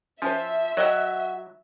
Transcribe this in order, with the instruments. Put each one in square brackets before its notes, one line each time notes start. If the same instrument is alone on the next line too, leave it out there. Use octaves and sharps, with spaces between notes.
[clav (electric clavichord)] F3 [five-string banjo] C#4 F4 C5 [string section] E5
[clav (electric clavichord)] F#3 [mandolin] F#4 E6 [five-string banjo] D5 D#5 G5